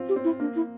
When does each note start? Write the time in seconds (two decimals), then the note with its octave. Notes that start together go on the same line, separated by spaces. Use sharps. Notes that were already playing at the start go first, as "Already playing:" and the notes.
Already playing: C4 F4
0.09 G4
0.16 C4
0.24 E4
0.40 A#3 D4
0.56 E4